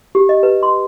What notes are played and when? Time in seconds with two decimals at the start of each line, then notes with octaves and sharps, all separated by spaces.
0.15 G4
0.29 D#5
0.43 B4
0.63 C6